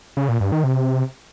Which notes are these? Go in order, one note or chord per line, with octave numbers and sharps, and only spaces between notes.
C#3
A#2
G2
D#3
C3